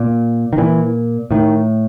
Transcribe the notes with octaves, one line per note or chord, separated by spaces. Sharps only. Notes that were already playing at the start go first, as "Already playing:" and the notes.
Already playing: A#2
D#3
A#2 E3
A2 D#3